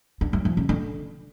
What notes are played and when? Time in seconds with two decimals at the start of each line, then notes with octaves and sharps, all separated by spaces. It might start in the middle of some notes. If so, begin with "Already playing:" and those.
0.21 D4
0.33 F#3
0.45 F3
0.57 C#3
0.69 D3